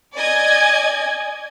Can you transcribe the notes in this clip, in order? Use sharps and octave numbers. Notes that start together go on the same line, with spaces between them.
D5 D#5 G#5 G#6